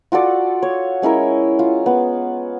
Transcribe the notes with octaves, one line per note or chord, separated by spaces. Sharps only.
F4 F#4 A4 D5
C#5
G#3 C#4 E4 A#4
F4
B3